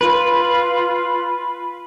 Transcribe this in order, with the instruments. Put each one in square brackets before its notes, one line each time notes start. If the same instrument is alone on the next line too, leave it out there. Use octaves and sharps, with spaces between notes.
[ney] F4 [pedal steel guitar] B4